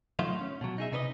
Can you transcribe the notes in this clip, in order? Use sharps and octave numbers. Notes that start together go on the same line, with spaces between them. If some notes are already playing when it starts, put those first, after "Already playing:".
F#3 A3 D#4 F4 E5 F5
C#4
B2 F#3
D#4 G#4 E5
C3 D#4 B4 C#5 D#5